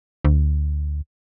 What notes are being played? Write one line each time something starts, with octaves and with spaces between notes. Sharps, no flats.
D2